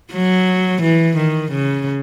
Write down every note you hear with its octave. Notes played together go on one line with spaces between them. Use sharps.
F#3
E3
D#3
C#3